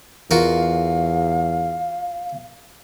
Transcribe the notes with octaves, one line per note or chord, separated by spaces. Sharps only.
E2 F4 F#4 A#4 F5